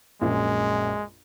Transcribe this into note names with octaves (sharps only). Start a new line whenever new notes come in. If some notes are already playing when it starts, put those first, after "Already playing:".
A#1 F#2 G#3